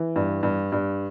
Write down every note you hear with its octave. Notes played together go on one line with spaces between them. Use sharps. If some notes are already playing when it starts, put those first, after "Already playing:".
Already playing: E3
G2
G2
G2